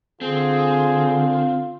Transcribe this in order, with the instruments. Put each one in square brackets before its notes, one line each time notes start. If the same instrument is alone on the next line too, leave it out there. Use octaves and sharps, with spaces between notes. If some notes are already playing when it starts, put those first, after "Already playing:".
[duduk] D3 [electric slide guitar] C4 [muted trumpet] F4 [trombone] G#4